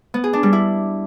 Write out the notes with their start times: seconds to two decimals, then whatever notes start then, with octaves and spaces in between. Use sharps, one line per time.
0.14 B3
0.24 G#4
0.33 D4
0.43 G3
0.53 E4